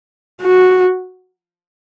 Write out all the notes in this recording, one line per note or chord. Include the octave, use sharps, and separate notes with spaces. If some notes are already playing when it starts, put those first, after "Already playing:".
F#4